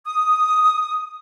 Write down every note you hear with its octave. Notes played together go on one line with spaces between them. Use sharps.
D#6